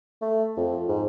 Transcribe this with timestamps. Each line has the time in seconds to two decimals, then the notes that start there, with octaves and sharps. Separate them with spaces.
0.22 A3
0.57 F2
0.88 G#2